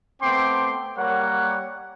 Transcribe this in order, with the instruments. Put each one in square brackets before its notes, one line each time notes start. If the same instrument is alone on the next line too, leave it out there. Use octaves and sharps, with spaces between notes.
[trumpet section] A3 B3 C4 G5 C6 D6
G3 A#3 A#4 C#5 F#5